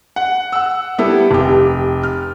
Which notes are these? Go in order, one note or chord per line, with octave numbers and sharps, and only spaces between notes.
F#5
F#5 E6
G3 B3 E4 A4
F1 G4
F6